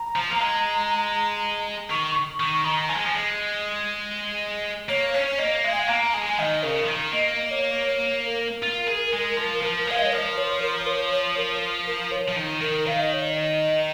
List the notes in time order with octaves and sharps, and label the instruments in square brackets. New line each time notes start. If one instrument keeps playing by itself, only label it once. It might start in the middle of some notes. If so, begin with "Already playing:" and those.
Already playing: [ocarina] A#5
[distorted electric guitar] F3
A#3
G#3
[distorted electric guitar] D#3 [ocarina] C#6
[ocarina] C#6
[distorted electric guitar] D#3 [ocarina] C#6
[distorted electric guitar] D#3 [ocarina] A#5
[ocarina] A#5
[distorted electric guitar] F3 [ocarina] G#5
[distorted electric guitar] G#3
F3
G#3
[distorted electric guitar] A#3 [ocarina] C#5
[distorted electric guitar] C#4 [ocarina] C#5
[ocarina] C#5
[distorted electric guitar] A#3 [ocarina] D#5
[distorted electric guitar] G#3 [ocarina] F5
[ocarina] G#5
F5
[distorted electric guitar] A#3 [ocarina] A#5
[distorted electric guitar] G#3 [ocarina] G#5
[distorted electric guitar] D#3 [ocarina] D#5
[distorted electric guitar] C#3 [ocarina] A#4
[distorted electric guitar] F3
D#3
[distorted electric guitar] A#3 [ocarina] D#5
[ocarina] D#5
C#5
C#5
A#4
[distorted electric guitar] F4
G#4
G#3
F3
F3
[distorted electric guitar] G#3 [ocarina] F5
[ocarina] D#5
C#5
[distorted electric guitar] F3 [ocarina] A#4
[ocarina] C#5
A#4
C#5
C#5
A#4
A#4
C#5
[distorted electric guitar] F3
D#3
[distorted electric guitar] D#3 [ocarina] A#4
[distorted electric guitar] D#3 [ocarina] F5
[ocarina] D#5
C#5
D#5